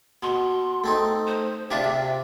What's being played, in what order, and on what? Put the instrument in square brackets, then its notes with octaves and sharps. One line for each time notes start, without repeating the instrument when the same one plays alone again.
[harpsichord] B2 [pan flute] C6
[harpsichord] A3 C4 D#4
[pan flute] C5
[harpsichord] C3 D4 F4 [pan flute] E5
[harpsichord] C3